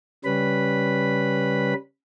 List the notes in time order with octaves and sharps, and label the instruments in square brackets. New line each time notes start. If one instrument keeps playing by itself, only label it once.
[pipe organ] C#3 G3 C#4 B4 B5